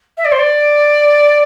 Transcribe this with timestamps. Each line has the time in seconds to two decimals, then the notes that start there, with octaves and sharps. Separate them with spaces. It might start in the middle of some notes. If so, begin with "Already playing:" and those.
0.17 E5
0.25 D5
0.32 C5
0.39 D5